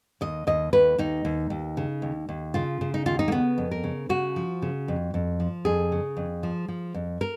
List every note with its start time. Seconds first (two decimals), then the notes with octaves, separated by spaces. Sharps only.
0.21 D#2 D#5
0.47 D#2 D#5
0.73 D#2 B4
0.98 D#2 D#4
1.25 D#2
1.50 D#2
1.77 C#3
2.02 D#2
2.29 D#2
2.54 C#3 F4
2.81 C#3
2.94 D#4
3.06 D#2 F4
3.19 D#4
3.28 A#3
3.32 C#3 B3
3.58 F2
3.71 A#4
3.84 C#3
4.09 C#3 F#4
4.36 F3
4.62 C#3
4.88 F2
5.14 F2
5.40 F3
5.65 F2 G#4
5.92 C#3
6.17 F2
6.43 F3
6.68 F3
6.94 F2
7.21 A#4